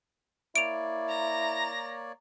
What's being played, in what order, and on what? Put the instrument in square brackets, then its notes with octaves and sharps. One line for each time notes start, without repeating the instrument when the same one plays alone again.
[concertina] A#3 C#5 D5 [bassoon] E4 [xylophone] D7 F7
[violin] A#5 A#6